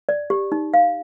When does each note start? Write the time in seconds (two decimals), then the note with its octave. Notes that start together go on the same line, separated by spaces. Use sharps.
0.09 D5
0.30 G4
0.52 D#4
0.74 F5